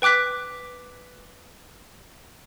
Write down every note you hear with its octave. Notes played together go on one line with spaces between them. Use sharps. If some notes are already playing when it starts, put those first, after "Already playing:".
B4 G5 D6 F#6 B6